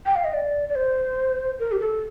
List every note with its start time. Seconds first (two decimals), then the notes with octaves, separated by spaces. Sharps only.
0.06 G5
0.15 F5
0.24 D#5
0.34 D5
0.69 D5
0.75 C5
1.59 A#4
1.72 G4
1.80 A4